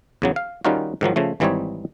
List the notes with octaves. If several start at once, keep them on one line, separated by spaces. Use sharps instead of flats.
E2 C#3 F#3
F5
D#3 G3 C#4 D#4 F4 F#4
G#2 D#3 F3 F#3
C#3 F3 A3
G#1 E3 G3 C4 D#4 C#5